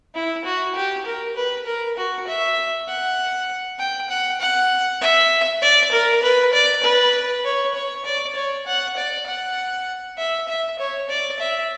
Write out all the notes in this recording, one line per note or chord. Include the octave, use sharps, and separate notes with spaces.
E4
F#4
G4
A#4
B4
A#4
F#4
E5
F#5
G5
F#5
F#5
E5
D5
A#4
B4
D5
B4
C#5
C#5
D5
C#5
F#5
D5
F#5
E5
E5
C#5
D5
E5